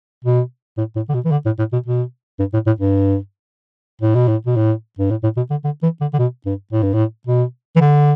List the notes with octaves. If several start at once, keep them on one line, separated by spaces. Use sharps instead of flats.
B2
A2
A2
D3
B2
E3
D3
A2
A2
B2
B2
G2
A2
A2
G2
A2
B2
A2
B2
A2
G2
A2
A2
B2
D3
D3
E3
D3
D3
B2
G2
A2
G2
A2
B2
E3
D3